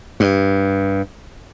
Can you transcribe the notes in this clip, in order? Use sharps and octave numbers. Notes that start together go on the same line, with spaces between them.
G2